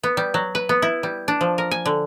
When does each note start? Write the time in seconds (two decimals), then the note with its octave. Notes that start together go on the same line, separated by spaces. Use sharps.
0.03 B3
0.17 G3
0.34 F#3
0.55 B4
0.69 B3
0.82 E4
1.03 G3
1.28 D4
1.41 F3
1.58 A#4
1.71 G#5
1.86 D3